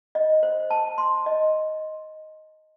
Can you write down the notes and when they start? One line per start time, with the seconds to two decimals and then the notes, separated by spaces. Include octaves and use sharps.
0.15 D#5
0.43 C5
0.70 A5
0.98 C6
1.26 D#5